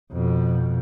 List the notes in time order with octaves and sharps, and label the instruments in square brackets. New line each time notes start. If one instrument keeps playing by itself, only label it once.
[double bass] F2 B2